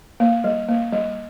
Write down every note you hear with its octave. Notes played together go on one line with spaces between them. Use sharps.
A#3
G3
A#3
G3